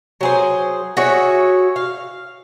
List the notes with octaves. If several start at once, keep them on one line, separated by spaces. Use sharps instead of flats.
F#3 G#4 C5
F#4 G#4 C#5 E5
F5